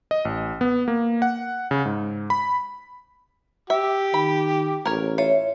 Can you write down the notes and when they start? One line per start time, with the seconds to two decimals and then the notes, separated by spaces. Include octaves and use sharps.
0.11 D#5
0.25 A1
0.61 B3
0.88 A#3
1.22 F#5
1.71 C#3
1.85 G#2
2.30 B5
3.70 G4 E5
4.14 D#3 B5
4.85 A1 A#4 C#5
5.18 F4 C#5 E5